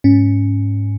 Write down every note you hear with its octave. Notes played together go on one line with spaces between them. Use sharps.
G#2 C#4